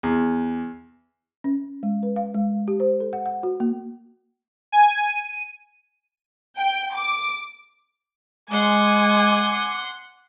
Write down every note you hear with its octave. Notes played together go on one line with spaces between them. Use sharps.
E2
C#4
G#3
B4
F5
G#3
G4
C5
A4
F#5
F#5
F#4
A#3
G#5
D#7
G5
D6
G#3 F#5 G#5 C6 D6